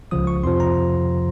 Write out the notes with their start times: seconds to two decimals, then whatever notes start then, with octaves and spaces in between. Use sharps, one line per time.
0.11 C#2 C#3 F3 D#6
0.27 C#6
0.43 F2 C3 F3 C6
0.60 A#5